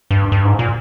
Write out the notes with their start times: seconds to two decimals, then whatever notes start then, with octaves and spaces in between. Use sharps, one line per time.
0.11 G2
0.32 G2
0.45 G#2
0.59 A#2